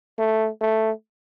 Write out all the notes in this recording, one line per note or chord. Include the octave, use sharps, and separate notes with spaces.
A3
A3